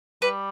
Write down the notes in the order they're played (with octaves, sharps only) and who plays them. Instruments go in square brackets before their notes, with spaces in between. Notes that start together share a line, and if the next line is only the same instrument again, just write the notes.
[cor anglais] G3 [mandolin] B4